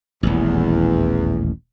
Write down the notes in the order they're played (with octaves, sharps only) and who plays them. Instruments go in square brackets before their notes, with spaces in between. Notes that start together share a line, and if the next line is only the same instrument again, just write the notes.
[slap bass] D#1 A1 [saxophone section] E2